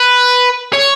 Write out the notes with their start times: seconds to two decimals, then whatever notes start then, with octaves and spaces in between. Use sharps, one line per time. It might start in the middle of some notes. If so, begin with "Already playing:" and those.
Already playing: B4
0.74 C#5